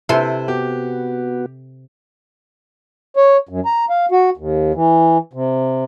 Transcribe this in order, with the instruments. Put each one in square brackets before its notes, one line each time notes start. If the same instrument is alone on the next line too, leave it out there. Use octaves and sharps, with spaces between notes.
[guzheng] C3 A4 C6 [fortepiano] E4 B4 C5
[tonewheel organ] B3 F#4 [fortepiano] G4
[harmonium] C#5
F#2
A#5
F5
F#4
D#2
E3
C3